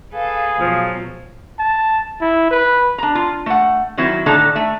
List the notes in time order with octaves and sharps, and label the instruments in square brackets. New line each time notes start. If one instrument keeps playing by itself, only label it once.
[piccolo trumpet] G#4 [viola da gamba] A4 B4 [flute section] F5
[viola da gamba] B2 F#3 [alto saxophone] F3
[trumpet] A5
E4
B4
[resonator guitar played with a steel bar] D4 A#5
F4
A3 F#5
D#3 F#3 C4 E4
A2 D3 D#3 D4 A4 A#5
A3 E5